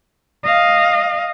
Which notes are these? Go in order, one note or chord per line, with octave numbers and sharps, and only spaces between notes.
D#5 F5